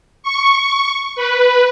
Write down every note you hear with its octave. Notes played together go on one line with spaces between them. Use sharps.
C#6
B4